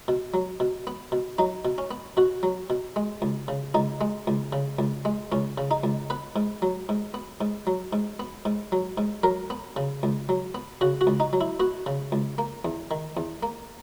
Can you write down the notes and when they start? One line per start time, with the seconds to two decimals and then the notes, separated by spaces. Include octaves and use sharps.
0.08 B2
0.34 F#3
0.60 B2
0.87 B3
1.12 B2
1.38 F#3 D#4
1.65 B2
1.78 C#4
1.91 B3
2.17 B2 F#4
2.43 F#3
2.70 B2
2.96 G#3
3.22 C#2
3.48 C#3
3.74 C#2 D#4
4.01 G#3
4.27 C#2
4.53 C#3
4.79 C#2
5.05 G#3
5.32 C#2 C#4
5.58 C#3
5.71 D#4
5.84 C#2
6.10 B3 B4
6.36 G#2
6.62 F#3
6.89 G#2
7.14 B3
7.41 G#2
7.67 F#3
7.93 G#2
8.20 B3
8.45 G#2
8.72 F#3
8.98 G#2
9.24 F#3 A#4
9.50 B3
9.76 C#3
10.03 C#2
10.29 F#3
10.55 B3
10.81 C#3 F#4
11.01 F#4
11.07 C#2
11.20 D#4
11.33 F#3
11.41 E4
11.60 B3 F#4
11.86 C#3
12.12 C#2
12.38 A#3
12.65 E2
12.91 D#3
13.17 E2
13.43 A#3